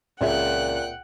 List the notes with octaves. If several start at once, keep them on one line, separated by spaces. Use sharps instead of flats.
C#2 A#2 C4 C#5 E5 F#5 G5 F#6